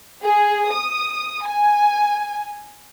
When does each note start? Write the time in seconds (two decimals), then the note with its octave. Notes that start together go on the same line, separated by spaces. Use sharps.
0.24 G#4
0.71 D#6
1.45 G#5